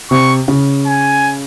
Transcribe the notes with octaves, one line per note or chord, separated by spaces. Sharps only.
C3 C#6
C#3
G#5